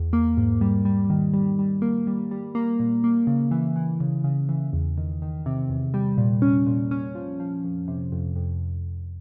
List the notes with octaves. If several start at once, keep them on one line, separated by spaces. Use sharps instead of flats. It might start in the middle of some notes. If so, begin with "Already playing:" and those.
Already playing: E2
A#3
G#2
G3
G3
D#3
G3
G3
A#3
G3
G3
A#3
A#2
A#3
C#3
E3
E3
C#3
C#3
E3
E2
D#3
D#3
C3
E2
G3
A#2
C#4
A#2
C#4
F3
F3
F2
C3
F2
F2